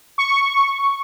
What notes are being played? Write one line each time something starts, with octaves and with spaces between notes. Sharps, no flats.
C#6